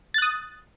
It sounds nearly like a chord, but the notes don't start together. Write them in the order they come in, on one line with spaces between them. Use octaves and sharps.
A6 F#6 D#6